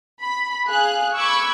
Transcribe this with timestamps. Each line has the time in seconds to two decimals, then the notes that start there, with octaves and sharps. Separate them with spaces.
0.21 B5
0.67 G#4 F5 F#6
1.16 B5 C#6 D6 E6 F#6 G#6